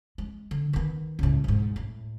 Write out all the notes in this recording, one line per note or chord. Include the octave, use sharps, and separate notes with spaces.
G#3
D3
D#3 B3
C#2 A2
B1 G#2
A2